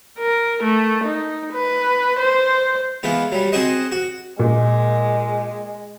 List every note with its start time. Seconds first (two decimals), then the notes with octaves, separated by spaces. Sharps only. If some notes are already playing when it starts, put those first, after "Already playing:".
0.19 A#4
0.63 A3
1.04 D#4
1.53 B4
2.20 C5
3.03 E3 G#3 B3 F4
3.32 F#3 G3
3.52 C4 F#4 G#4 C5 D#5
3.92 F#4
4.39 A#2 G#3